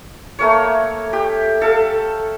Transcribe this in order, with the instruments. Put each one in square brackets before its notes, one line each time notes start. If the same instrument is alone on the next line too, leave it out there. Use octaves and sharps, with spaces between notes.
[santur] A3 A#3 C#5
G4
A4 F5